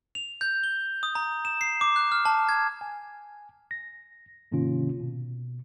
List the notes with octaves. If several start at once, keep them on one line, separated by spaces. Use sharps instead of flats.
F7
G6
G7
D#6
A#5
E7
C7
D6
F#6
F6
A5
G#6
G#5
A#6
G#2 C3 D#3 A#3 C#4 F4
B2